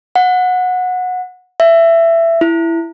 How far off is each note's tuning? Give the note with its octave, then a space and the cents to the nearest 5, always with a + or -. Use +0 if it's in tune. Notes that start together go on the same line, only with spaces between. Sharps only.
F#5 -20
E5 +15
E4 +10